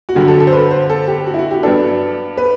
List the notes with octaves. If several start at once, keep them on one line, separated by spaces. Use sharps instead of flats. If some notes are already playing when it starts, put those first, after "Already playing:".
F#4
G2 D3 F#3 G4
A4
A4
C5
B4
C5
A4
G4
F#4
E4
F#4
G4
G2 F#3 B3 D4 A4
B4